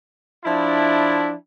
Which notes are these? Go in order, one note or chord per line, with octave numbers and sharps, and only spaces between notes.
F3 D4 E4